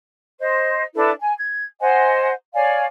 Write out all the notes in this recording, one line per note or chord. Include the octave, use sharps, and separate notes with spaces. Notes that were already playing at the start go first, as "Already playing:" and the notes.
C5 D#5
D4 E4 A4 B4
G#5
G#6
C5 D#5 F#5 G#5
C#5 D5 F5 G#5